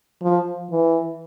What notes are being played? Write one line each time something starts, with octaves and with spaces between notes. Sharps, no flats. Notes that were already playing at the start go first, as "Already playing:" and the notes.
F3
E3